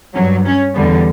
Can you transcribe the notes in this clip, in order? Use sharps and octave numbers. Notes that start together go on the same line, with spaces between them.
F#3 C#4
G2
C#4
E2 D3 G3 B3